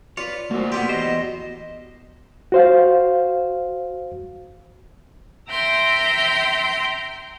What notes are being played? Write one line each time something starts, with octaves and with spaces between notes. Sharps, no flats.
F4 B4 C#5 D5
A3 A#3 F#4 C5 E5
B3 G4 F#5 C6
E2 C5 D#5
F#4 C5 F5
E5 G5 A#5 C6 G6